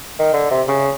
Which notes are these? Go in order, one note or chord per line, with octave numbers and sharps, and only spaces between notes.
D#3
D3
C3
C#3